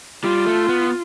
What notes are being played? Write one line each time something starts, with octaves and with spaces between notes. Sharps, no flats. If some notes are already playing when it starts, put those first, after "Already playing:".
G3 F4
A3
B3